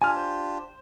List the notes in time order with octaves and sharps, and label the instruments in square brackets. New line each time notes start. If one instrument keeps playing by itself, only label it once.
[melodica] D4 F4 G4 [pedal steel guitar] G#5 F6
[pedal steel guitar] C5